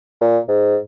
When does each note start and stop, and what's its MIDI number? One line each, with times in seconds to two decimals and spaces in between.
0.21 0.38 46
0.48 0.77 44